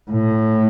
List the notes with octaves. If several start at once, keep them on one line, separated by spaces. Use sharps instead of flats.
A2